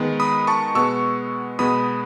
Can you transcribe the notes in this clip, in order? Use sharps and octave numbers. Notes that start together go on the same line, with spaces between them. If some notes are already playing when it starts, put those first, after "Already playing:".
Already playing: D#3 G#3 B3
B5 D#6
A5 C#6
B2 G#3 B3 C#6 E6
B2 G#3 B3 B5 D#6